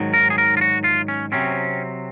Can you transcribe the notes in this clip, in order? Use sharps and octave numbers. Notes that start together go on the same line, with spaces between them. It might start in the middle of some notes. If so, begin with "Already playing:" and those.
Already playing: G#2 D#3 F#3
A#4
G#4
A#4
F4
F#4
F4
C#4
C3 F#3 C4 C#4